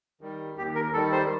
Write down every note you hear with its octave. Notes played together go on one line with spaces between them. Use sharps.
D#3 G3
D#2 G4
A#4
D#3 G3 A4
C5